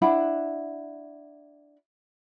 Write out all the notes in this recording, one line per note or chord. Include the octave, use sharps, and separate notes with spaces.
D4 E4 F#5 B5